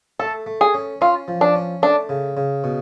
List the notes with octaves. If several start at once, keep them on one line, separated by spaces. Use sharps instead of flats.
A3 A4
A3
G#4
C#4
C#4 F4
F3
D4
C#4
A3 D4
C#3
C#3
B2